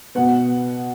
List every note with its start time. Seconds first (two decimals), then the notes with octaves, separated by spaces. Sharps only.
0.15 B2 B3 F#5